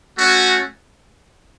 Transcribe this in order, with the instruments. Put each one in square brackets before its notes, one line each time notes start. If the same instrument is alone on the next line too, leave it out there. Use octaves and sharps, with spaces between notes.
[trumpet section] A3 C#4 F#4